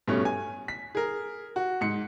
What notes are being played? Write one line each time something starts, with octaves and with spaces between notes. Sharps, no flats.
G2 B2 A3 C#4
G#5
B6
G#4 A#4
F#4
G#2 C#7